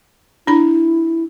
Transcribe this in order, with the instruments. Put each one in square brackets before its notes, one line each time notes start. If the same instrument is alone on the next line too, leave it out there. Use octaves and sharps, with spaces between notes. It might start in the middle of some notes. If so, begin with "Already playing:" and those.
[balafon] D4 B5 [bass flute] E4